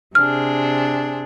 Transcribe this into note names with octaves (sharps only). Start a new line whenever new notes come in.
C3 D4 G#4 F6